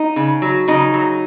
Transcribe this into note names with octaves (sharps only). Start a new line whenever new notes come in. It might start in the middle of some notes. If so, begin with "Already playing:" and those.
Already playing: D#4
C#3
F#3
C#3 D#4
F#3